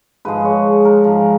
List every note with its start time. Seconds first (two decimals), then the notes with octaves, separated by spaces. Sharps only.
0.25 G#2 F3 G#3 B4
0.45 C#5
0.85 A#4
1.04 G#2 F3 G#3 A#4